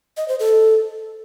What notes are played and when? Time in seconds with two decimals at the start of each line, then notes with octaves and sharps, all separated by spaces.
0.17 D#5
0.28 C5
0.40 A4